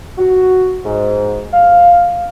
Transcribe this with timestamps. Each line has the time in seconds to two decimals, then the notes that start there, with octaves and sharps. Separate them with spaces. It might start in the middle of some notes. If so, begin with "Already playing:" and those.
0.18 F#4
0.85 G#2
1.54 F5